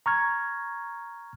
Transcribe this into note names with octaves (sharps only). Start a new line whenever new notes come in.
A#5 C#6 F6 G#6